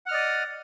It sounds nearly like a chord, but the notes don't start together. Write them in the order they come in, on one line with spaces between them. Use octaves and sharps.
F#5 F6 D#5 D5 D#6